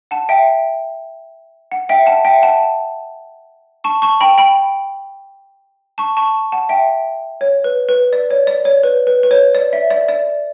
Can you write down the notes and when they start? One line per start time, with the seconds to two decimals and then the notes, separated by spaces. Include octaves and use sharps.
0.11 F#5 A5
0.29 E5 G5
1.72 F#5
1.89 E5 G5
2.06 F#5 A5
2.25 E5 G5
2.42 F#5 A5
3.84 A5 C#6
4.02 A5 C#6
4.21 G5 B5
4.38 G5 B5
5.98 A5 C#6
6.17 A5 C#6
6.52 F#5 A5
6.69 E5 G5
7.41 C#5
7.64 B4
7.89 B4
8.13 D5
8.31 C#5
8.47 D5
8.65 C#5
8.83 B4
9.07 B4
9.23 B4
9.31 C#5
9.55 D5
9.73 E5
9.90 D5
10.09 D5